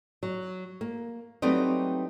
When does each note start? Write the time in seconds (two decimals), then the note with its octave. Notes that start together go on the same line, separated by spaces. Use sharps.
0.23 F#3
0.81 A#3
1.42 F#3 G3 A3 B3 C4 D#4